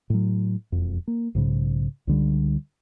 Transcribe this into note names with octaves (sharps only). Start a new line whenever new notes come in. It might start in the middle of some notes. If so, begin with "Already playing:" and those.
A2 F#3
E1 F2
A#3
B1 G#2 C#3
C#2 D3 G3